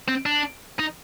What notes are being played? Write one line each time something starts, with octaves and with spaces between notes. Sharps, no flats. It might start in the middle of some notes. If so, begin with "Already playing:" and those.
C4
D4
D#4